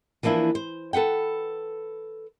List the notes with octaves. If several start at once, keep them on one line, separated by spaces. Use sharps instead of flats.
E3 F3 A#3 D4 E4
C5
A4 B4 F#5 G5